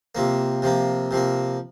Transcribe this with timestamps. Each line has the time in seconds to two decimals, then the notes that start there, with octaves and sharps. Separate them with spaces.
0.15 C3 F3 A#3
0.62 C3 F3 A#3
1.11 C3 F3 A#3